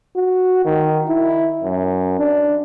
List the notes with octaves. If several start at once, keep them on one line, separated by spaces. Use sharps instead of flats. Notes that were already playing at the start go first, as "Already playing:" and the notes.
F#4
D#3
E4
F#2
D4